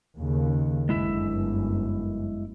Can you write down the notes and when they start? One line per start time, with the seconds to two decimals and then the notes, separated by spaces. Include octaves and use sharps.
0.16 D#2 C#3
0.89 G1 F#2 G#3 E4 E5